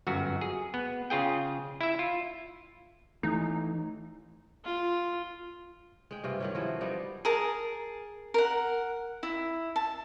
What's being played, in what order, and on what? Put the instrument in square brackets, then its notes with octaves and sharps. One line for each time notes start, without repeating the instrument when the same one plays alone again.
[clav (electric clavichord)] G1 F#2 F#4
G#4
B3
C#3 F4 G#4 G5
E4 E5
F4
[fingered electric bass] E3 A3 [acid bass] D#4
[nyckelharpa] F4
[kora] G#3 G5
G2 C3 F4
D#3 F#3 C#4
F3 E4 F#4
F3 G3 B3 D#4
[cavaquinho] G#4 A#4 A5
A#4 F#5
E4
A5